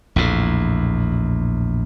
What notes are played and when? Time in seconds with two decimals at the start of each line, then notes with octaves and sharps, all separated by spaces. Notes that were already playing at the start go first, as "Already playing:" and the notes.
0.16 A#1 E2 A2